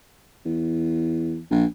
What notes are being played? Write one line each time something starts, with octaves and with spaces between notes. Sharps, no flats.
E2
A#1